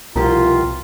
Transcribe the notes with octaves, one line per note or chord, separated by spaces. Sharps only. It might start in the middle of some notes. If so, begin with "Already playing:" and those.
C2 B2 F3 F4 G4 A#4 A#5